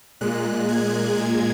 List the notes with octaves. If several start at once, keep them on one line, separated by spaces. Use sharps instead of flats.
A#2 G#3 F#6
G#6
A#2 G#3